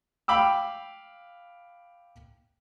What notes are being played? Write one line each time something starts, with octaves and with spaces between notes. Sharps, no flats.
F5 G5 B5 D6 E6